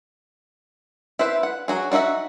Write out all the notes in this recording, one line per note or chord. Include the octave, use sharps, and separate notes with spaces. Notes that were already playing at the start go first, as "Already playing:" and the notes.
E4 B4 C5 E5
F#5
F#3 F#4 G#4
D4 D#4 F#4 E5 F#5